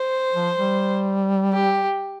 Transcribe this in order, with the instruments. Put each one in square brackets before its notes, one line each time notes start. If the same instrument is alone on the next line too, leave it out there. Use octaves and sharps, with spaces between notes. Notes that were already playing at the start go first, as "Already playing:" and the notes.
Already playing: [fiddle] C5
[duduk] F3
G3
[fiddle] G4